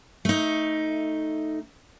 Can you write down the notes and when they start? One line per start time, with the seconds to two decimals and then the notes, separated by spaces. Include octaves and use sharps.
0.25 A3 D#4